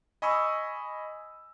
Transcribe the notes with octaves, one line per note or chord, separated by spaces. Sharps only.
D#5 G#5 B5 C#6 D#6 E6